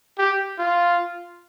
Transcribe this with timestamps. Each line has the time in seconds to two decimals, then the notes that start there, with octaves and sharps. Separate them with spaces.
0.18 G4
0.59 F4